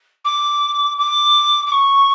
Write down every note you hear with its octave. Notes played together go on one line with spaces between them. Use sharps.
D6
D6
D6
C#6